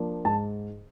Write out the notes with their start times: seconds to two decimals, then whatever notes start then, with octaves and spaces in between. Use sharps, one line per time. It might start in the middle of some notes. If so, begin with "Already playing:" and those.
Already playing: F3 A#3 D4
0.25 G#2 A5